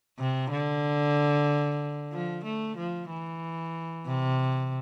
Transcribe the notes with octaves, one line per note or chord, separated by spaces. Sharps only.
C3
D3
F3
A3
F3
E3
C3